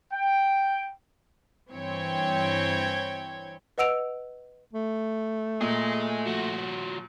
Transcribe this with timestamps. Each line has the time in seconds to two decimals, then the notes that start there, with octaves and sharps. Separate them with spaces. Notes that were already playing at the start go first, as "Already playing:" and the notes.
0.13 G5
1.70 G2 E3 C4 C#5 G5 G#6
3.78 B4 D#5 F#5 E6 D7 F7
4.73 A3
5.61 A#2 G#4 D#5
6.26 F3 F#4